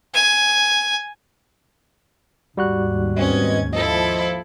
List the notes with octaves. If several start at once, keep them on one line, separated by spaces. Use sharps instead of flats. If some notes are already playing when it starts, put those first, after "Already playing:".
G#5
D#2 G#2 G3 F#4 F#6
C4 C#4 B4 D#5 G#6
F3 E4 A4 D#5